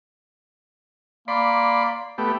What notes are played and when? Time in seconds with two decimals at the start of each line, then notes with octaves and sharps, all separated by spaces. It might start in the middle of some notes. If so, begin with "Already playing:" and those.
1.28 A#3 D5 B5 C6
2.18 A3 B3 G4